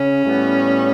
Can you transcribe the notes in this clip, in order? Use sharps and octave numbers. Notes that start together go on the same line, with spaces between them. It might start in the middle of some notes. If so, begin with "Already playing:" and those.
Already playing: C#3 C#4
A2 G3 B3